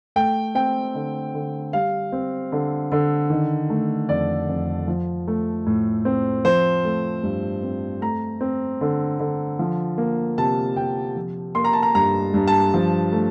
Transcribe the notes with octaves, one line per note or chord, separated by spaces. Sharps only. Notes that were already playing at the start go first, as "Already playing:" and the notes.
A3 G5
C4 G5
D3
D3
G3 F5
C4
D3
D3
D#3
A3
F2 D5
F2
F3
A3
A2
C4
F3 C5
A3
G2
C4
A3 A#5
C4
D3
D3
F3
A#3
C3 A5
C3 G5
F3
A#3 C6
A#5
A5
A#5
G2 A#5
G2
A5
F3
A3